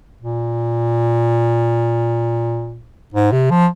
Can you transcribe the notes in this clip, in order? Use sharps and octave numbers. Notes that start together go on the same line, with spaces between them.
A#2
G#2
C3
F3